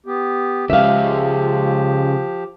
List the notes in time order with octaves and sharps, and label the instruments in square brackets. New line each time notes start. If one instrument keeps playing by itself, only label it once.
[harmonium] B3 G4
[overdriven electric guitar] C#3 G#3 [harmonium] F3 G4 [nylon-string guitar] E5 F5